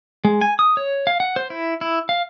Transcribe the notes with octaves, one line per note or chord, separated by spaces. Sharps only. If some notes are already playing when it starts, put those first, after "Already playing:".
G#3
G#5
D#6
C#5
F5
F#5
C5
E4
E4
F5